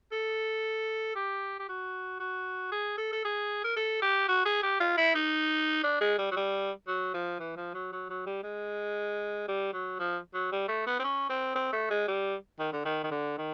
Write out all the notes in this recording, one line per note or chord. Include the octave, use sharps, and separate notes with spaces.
A4
G4
G4
F#4
F#4
G#4
A4
A4
G#4
A#4
A4
G4
F#4
G#4
G4
F4
E4
D#4
D4
G#3
G3
F#3
G3
F#3
F3
E3
F3
F#3
F#3
F#3
G3
G#3
G3
F#3
F3
F#3
G3
A3
B3
C4
C#4
C4
C4
A3
G#3
G3
D#3
D3
D#3
D#3
D3
D#3